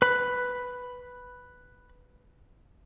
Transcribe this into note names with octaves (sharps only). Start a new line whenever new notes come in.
B4 B5